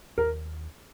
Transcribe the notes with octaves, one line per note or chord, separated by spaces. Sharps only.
D#2 A#4